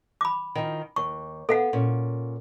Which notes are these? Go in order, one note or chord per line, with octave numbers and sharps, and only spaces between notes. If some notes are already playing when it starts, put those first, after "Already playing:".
B5 D6
D#3 F3
D#2 C#6
B3 A4 F5 F#5
A#2 C#4